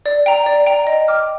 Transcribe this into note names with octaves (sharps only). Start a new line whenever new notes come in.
D5
G5 A#5
D5
G5 A#5
D#5
G5 D6 F6